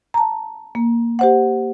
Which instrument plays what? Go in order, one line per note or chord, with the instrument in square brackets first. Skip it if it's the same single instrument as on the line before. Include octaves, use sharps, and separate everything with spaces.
[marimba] A5 A#5
A#3
G4 C5 F#5